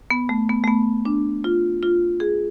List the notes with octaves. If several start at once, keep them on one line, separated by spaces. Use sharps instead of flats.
B3
A3
B3
A3
B3
D4
F4
F4
G#4